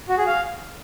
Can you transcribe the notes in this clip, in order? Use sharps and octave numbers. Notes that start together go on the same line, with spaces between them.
F#4
G#4
F5